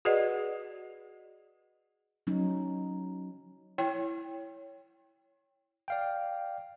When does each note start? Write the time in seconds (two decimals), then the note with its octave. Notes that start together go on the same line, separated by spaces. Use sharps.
0.05 F#4 G#4 B4 D5 D#5 F#5
2.27 F#3 C#4 D#4
3.78 E4 C#5 G5
5.88 D5 F5 G5